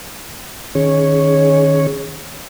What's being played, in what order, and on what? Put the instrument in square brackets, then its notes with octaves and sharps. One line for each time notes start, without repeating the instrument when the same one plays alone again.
[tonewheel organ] D#3 C#4 G#4 C#5